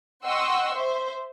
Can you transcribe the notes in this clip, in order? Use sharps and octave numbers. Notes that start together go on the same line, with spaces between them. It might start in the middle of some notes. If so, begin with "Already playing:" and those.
D#5 F#5 G5 C6 C#6 E6
C5 E5